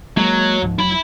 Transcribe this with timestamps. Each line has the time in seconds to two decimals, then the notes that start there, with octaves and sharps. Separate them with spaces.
0.17 F#3 G#3 A#3
0.62 C#2 G#2 F3
0.79 F1 F#3 E4 B5